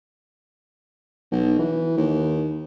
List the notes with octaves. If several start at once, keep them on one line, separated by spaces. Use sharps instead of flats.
B1
E3
D#2